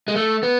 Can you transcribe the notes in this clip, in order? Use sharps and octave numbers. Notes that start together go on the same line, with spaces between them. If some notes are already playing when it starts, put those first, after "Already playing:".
G#3
A3
B3